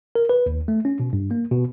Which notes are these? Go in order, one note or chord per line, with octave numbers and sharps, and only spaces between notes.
A#4
B4
D#2
A3
C#4
B2
G2
A#3
B2